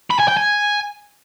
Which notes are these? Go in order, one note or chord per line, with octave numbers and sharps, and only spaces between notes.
B5
G#5
G5
G#5